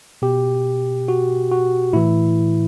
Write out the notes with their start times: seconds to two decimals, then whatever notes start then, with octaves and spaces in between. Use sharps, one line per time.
0.22 B2 G4
1.08 F#4
1.51 F#4
1.93 A2 E3 E4